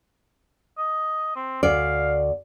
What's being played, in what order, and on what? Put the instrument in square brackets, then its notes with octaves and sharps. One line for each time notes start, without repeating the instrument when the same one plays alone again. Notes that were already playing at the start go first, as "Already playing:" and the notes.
[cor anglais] D#5
C4
[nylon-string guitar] D2 D5 [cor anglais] F5